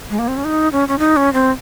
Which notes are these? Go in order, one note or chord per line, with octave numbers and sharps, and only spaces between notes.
G#3
A#3
C4
C#4
D#4
C#4
C#4
D#4
C#4
C4